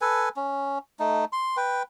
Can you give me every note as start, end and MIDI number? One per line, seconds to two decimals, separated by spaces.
0.01 0.29 69
0.01 0.29 71
0.01 0.29 80
0.36 0.79 61
0.99 1.25 57
0.99 1.25 63
1.33 1.57 84
1.57 1.83 71
1.57 1.83 79